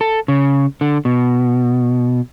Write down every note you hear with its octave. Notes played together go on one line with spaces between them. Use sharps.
A4
C#3
D3
B2